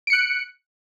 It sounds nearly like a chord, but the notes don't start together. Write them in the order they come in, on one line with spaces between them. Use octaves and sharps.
D7 C#7 F#6